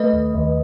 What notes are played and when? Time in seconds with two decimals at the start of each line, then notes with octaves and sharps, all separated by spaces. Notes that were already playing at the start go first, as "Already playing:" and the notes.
Already playing: A3 B4 D#5
0.13 D#2
0.34 D#2